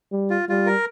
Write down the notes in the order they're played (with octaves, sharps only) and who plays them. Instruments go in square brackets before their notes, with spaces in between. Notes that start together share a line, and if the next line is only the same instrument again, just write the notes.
[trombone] G3
[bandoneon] F4
[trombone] G3 [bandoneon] F4
[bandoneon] A#4